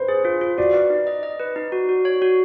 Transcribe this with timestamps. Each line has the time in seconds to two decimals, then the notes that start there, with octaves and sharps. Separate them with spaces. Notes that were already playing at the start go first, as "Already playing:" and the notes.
Already playing: B4 C5
0.08 G#4
0.25 F4
0.41 F4
0.58 F#4 D5
0.74 B4
0.90 D#4
1.07 D#5
1.23 D#5
1.40 B4
1.56 D#4
1.72 F#4
1.89 F#4
2.05 C#5
2.22 F#4